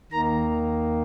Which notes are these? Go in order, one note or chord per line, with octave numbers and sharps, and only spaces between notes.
D#2 D#3 A#3 A#5